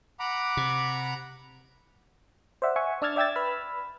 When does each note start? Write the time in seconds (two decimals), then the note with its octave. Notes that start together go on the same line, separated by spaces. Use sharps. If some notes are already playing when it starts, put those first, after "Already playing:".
0.20 F#5 A#5 B5 D6
0.57 C3
2.62 C5 D5 E5 F#5
2.76 E5 F#5 G#5 C#6
3.02 D4 D5 E6 F6 G#6 A6
3.16 D5 E5 G5 E6 G#6 A6
3.35 B4 B5 E6 F6